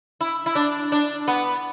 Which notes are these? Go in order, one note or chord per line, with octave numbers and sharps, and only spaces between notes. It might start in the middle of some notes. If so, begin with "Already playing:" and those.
E4
E4
D4
D4
B3